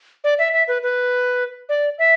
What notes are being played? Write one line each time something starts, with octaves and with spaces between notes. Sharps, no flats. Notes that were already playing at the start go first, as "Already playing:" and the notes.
D5
E5
E5
B4
B4
D5
E5